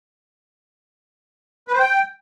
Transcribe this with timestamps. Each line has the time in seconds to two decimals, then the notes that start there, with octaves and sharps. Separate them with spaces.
1.68 B4
1.74 C5
1.79 G5